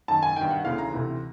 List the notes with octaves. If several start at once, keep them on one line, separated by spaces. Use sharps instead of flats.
F#2 D#3 A5
G#5
G2 D#3 G5
F#5
D2 C#3 E3 F5
A#5
D2 C3 E3